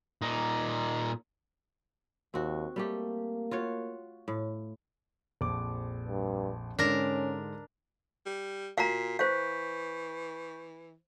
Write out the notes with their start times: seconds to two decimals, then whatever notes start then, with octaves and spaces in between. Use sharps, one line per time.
0.22 A#2 D#4
2.34 D#2 C4 F#4
2.76 G3 A3 A#3 G4
3.51 F4 F#4 C#5
4.28 A2
5.41 A#1 F2 D6
6.08 G2
6.79 G#2 D3 C#4 D4 A#4 A#5
8.26 G3
8.78 A#2 F#4 F5 A#5 B6 C7
9.19 E3 C5 F5 C#6 G6 B6